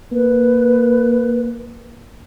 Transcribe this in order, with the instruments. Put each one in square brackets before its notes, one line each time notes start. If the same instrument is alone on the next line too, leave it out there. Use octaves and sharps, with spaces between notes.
[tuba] A#3 [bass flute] B4